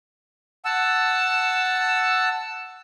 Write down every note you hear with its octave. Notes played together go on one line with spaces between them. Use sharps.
F#5 A5 E6